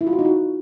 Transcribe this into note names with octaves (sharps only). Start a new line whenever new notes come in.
E4
F4
F#4
D#4
F#4